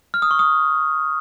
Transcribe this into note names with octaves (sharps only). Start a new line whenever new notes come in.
F6
D#6
C#6
D#6